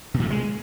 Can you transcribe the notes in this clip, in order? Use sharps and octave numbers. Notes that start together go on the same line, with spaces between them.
C3
A#2
A3
G#3